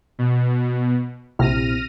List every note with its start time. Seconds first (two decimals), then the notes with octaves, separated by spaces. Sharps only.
0.19 B2
1.39 A#1 C3 E4 F6 A#6 D#7